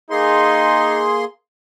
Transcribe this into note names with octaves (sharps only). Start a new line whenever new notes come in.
A#3 D#4 G#4 C6